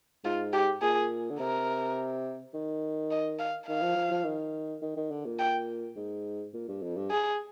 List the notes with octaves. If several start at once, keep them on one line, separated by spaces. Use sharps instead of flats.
G#2 F4
G4
A#2 G#4
D3
C3 A#4
D#3
D#5
F5
D#3 F5
F3
F3
F3
D#3
D#3
D#3
D3
A#2
G5
G#2
A#2
G2
F2
G2
G#4